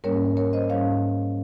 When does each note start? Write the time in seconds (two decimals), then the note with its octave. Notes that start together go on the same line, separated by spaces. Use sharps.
0.04 G#2 G3 A#3 C#4 A#4 C#5
0.37 A#4 C#5
0.53 C5 D#5
0.70 G#2 G3 C#4 C#5 F5